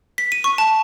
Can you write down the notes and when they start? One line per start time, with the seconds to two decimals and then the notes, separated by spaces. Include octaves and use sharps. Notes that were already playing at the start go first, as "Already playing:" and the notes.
0.18 B6
0.32 D#7
0.44 C#6
0.58 A5